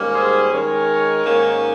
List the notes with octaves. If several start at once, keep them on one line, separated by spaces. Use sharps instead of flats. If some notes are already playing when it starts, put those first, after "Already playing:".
Already playing: G#2 D#3 G3 A#3 C#4
G#4 C5
D#3 G#3 C#4 A#4 C#5
G#2 D#3 A#3 C#4